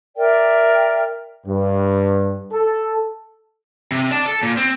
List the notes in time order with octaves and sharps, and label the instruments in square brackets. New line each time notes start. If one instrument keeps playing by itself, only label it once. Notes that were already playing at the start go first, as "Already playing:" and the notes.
[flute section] A#4 D5 E5 G5
[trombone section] G2
A4
[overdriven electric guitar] C3
D5 A5
A4
A#2
C4